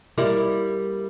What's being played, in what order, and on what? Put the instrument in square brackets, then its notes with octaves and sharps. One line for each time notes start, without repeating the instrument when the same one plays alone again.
[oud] G3 A#3 E4